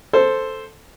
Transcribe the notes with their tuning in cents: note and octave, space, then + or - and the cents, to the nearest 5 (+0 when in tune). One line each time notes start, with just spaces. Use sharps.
A4 +0 C5 +0